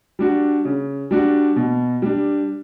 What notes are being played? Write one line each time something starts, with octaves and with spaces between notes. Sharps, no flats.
G3 D4 F#4
C#3
G3 D4 F#4
B2
G3 D4